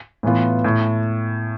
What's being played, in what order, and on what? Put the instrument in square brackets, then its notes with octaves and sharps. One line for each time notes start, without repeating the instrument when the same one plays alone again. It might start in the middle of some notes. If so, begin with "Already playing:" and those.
[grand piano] A2 E3 B3 F4
A2